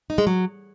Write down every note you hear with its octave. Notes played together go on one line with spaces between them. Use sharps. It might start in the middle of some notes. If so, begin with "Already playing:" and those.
D#4
G#3
F#3